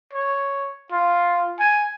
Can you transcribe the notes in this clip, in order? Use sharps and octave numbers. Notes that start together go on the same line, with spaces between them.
C#5
F4
G#5